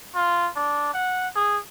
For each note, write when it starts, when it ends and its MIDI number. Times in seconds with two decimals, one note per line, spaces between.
0.15 0.49 65
0.56 0.93 62
0.94 1.28 78
1.36 1.58 68